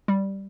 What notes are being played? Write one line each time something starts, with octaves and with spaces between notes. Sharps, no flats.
G3